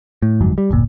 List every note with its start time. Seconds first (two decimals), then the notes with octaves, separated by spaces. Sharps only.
0.22 A2
0.41 G1 F2 G#2 F#3
0.58 G3
0.71 D1 G1 A#2